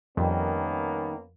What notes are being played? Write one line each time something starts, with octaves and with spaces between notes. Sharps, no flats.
F2 D#3 G3 A#3 B3 C#4